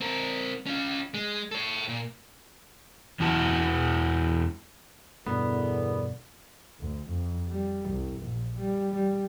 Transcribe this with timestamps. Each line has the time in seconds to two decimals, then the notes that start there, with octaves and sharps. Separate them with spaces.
0.01 C4 A#4
0.66 C#4 F4
1.14 G#3
1.51 A4 C#5
1.88 A#2
3.20 E2 E3 F#4 A5
5.27 E2 G2 B2 D3 B3 A#4
6.80 D2
7.09 F2
7.49 G3
7.89 C2
8.21 A#1
8.58 G3
8.94 G3